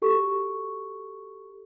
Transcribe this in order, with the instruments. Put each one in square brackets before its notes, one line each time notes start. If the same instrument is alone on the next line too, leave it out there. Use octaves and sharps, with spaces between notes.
[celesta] F#4 G4 A4 C#6